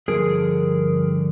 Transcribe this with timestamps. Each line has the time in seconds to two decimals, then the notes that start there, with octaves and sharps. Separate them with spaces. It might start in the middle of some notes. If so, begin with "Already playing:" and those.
0.08 G2 D3 F3 G#4 A#4